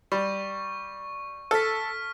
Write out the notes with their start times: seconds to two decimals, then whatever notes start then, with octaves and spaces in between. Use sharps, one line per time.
0.12 G3 C#6
1.51 A4 F6 B6